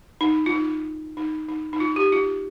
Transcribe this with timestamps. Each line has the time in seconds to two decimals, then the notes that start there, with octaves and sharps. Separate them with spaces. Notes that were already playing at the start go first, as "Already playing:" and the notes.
0.21 D#4
0.46 F4
0.52 D#4
1.17 D#4
1.48 D#4
1.73 D#4
1.80 F4
1.96 G4
2.12 F4